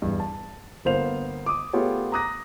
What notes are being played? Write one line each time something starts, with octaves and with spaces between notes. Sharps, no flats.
E2 G2
A5
G1 A#3 B3 C5 F5 F7
D6 D#6
A3 B3 F4 G4 G#4 C#5
A#5 D6 D#6 F#6 A#6